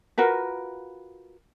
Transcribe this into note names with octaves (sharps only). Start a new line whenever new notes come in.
F4 F#4 A#4 B4